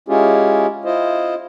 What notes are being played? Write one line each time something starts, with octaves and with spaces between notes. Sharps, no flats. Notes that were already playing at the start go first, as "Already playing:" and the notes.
G#3 C#4 E4 F4 G4 G#4
E4 F4 C5 D#5